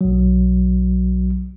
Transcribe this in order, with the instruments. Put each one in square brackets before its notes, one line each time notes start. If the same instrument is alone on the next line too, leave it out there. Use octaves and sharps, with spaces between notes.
[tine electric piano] B1 F#3